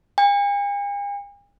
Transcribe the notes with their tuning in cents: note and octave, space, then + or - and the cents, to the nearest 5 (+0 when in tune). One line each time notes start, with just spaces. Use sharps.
G#5 -45